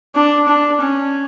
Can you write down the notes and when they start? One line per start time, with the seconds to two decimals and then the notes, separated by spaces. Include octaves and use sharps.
0.15 D4
0.48 D4
0.81 C#4